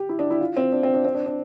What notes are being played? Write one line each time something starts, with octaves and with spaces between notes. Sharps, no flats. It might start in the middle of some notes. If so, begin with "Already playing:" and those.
Already playing: G4
E4
D4
E4
F4
C4
D4
C4
D4
C4
D4
D4